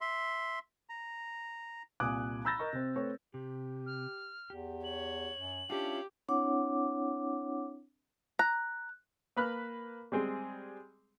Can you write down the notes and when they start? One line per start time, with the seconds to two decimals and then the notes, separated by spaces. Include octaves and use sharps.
0.01 E5 C6
0.89 A#5
2.00 C2 A#2 G#5 D6 D#6 F#6
2.45 A#5 B5 E6 G6 A6 A#6
2.59 A#4 D#5 C#6
2.73 C3 C4
2.96 A3 C4 B4 C#5
3.34 C3 G4
3.86 F6
4.50 E2 G4
4.84 C#5 F#7
5.37 F#2
5.70 C#4 D4 E4 F4 G4
6.29 C4 D4 E4 C#5 F#5 D6
8.39 A#5 F#6
9.36 A#3 B4 B5 F6 F#6
10.12 G3 G#3 C4 G#4